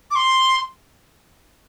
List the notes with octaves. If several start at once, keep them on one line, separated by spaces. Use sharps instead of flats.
D6
C6